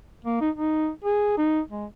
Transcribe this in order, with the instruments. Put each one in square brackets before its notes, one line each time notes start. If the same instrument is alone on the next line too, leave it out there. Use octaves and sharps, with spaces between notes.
[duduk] A#3
D#4
D#4
G#4
D#4
G#3